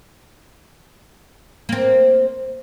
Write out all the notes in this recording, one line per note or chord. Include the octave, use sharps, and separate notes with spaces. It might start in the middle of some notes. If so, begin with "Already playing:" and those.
A#3 C4